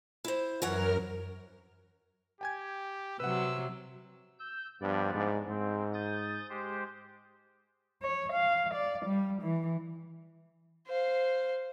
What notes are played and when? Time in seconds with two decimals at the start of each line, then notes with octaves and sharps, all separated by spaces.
0.24 E4 C5
0.62 F#2 E3 A#4 C#5 F#5 F6
2.41 G4 G5 G#5 G#6
3.20 C3 F#3 B4 F#5 E6
4.39 E6 G6
4.81 G2 F3 B3 D5
5.15 G#2
5.48 G#2 C4
5.94 D#6 G6 A6
6.49 G#3 G4 C5
8.02 C#5
8.33 F5
8.74 D5
9.06 G3
9.42 E3
10.87 C5 F5